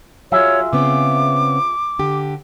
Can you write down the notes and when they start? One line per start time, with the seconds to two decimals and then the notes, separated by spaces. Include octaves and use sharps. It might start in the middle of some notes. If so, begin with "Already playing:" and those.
0.32 F#3 F4 G#4 C#5 E5
0.73 C#3 B3 C4 D6
1.99 D3 G4